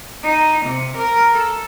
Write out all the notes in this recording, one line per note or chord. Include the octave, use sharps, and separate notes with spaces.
D#4
C3
A#4
A4